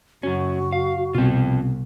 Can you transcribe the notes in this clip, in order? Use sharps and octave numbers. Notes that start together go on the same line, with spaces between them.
F#1 F#2 C#4 F#4
F5
C2 B2 C4 F4